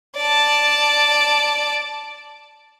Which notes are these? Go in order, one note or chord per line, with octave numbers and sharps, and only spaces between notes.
D5 A5